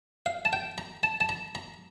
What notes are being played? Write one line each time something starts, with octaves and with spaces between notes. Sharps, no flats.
F5
A5
G5
A#5
A5
A5
A#5
A#5